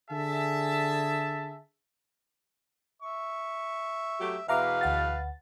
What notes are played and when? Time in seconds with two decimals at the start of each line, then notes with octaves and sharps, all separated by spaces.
0.11 D3 G#4 E5 A5
3.02 E5 C#6
4.20 F#3 A3 G4
4.48 E2 B2 B4 E5 F5 A#5 D6
4.81 D2 F#5 A6